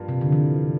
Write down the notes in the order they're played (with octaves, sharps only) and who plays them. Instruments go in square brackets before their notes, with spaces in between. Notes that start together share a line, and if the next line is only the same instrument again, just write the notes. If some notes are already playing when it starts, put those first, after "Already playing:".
Already playing: [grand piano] G2 F3 A#3 F4
[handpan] C3
D3
E3